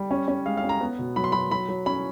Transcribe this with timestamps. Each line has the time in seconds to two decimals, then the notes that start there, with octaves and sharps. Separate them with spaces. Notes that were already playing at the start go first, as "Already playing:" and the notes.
Already playing: G3
0.11 C#4
0.28 C#4
0.46 G#3 F5
0.57 F5
0.64 C#4
0.69 A#5
0.81 B3
0.99 B2
1.16 F#3 B5
1.24 C6
1.32 F#3 B5
1.51 F#3 B5
1.69 F#3
1.86 C#4 B5